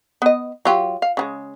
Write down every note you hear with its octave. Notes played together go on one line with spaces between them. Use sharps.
B3 D#5
F#3 F4 G4
F5
C#3 F#3 G#3